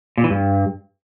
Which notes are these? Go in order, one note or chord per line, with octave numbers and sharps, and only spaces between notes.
A#2
E3
G2